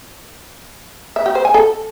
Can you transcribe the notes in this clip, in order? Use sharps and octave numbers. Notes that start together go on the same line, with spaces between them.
E5
G4
C5
G#5
A4